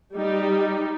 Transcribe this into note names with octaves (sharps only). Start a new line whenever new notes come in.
G3 D#4